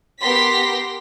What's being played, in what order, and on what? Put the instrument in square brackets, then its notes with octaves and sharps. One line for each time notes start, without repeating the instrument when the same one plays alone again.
[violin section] B3 G4 A#4 C6 A#6 B6